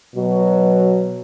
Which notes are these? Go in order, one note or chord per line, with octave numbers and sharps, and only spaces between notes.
B2 F#3